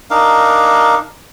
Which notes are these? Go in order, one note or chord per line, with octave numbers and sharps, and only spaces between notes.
D4 D#4 A#4 F5